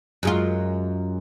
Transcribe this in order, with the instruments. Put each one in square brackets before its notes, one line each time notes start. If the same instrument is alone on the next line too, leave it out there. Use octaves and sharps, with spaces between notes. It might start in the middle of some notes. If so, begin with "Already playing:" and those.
[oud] F#2 G#3 F4